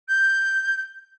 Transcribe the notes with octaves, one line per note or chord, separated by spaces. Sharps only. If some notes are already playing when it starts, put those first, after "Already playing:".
G6